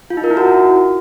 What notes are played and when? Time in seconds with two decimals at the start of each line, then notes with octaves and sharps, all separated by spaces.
0.10 F4
0.17 D#4
0.24 A#4
0.30 E4
0.37 F#4